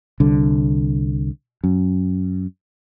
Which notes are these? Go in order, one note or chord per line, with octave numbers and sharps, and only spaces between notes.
C2 D3
F#2